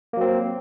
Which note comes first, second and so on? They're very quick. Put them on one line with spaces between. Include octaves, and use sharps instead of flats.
A#3 F#3 C4